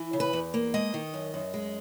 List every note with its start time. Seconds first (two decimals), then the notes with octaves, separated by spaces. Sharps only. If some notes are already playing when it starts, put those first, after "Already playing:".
Already playing: E3
0.13 C#3
0.20 B4
0.33 E2
0.54 A#3
0.74 G#3 D#5
0.94 D#3
1.14 F#2
1.34 F#2
1.54 G#3